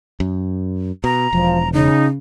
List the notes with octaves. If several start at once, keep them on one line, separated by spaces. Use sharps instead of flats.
F#2
B2 A#5
E1 F3
C#3 D#4